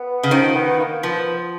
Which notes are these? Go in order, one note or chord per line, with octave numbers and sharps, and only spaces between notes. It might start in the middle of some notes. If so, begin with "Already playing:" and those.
Already playing: B3
C#3
D#3 F3
B3
A#3
F3 B3